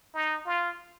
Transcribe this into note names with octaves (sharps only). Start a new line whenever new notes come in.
D#4
F4